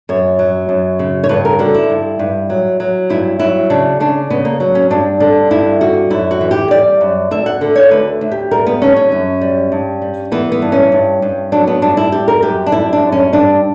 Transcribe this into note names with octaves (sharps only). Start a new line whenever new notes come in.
F#2 C#5
F#3
F#2
C#3
C#5
G2 B4
A#4
D3 F#4
E4
G2
G2
F#3
F#3
G2 E4
F#3 E4
C#3 D4
C#3 D4
C#3 B3
A#3
F#3
C#4
G2 D4
D3 D4
G2 E4
D3 F#4
F#2 E4
F#4
E3
G4
G3 D5
F#2
D2 E5
F#5
D3
C#5
D2 B4
D2
G4
G3 A#4
B3
D3 C#4
C#4
F#2
G3
G2
G3
E3 B3
B3
G2
C#4
G2
G2
F#3 D4
B3
G2 D4
E4
G3 G4
A#4
F#2 G4
D4
G3 E4
D4
F#2
C#4
G2 D4